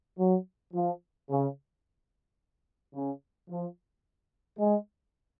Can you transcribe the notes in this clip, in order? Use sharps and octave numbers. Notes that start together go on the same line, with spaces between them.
F#3
F3
C#3
C#3
F3
G#3